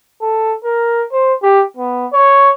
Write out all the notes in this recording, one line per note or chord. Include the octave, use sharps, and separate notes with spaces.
A4
A#4
C5
G4
B3
C#5